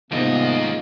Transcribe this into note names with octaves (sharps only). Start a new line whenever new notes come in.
D#2 G#2 C3 A#3 B3 D#4 F4 D#5